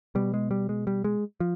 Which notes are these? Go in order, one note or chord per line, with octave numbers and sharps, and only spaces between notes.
B2 G3
G#3
G3
G#3
G3
G#3
F3